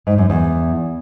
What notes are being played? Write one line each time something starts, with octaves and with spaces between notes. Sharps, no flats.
G#2
F#2
E2